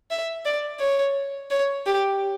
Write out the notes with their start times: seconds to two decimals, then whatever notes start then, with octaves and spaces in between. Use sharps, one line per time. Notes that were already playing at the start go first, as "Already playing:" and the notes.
0.11 E5
0.45 D5
0.80 C#5
1.51 C#5
1.86 G4